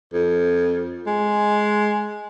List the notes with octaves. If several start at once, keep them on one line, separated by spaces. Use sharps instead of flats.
F2
G#3